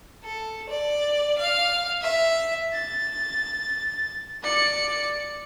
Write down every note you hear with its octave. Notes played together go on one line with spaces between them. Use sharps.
A4
D5
F5
E5
A6
D5 C#7